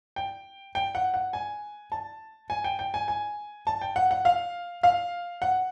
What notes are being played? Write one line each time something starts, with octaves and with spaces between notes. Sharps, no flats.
G5
G5
F#5
F#5
G#5
A5
G#5
G5
G5
G#5
G#5
A5
G5
F#5
F#5
F5
F5
F#5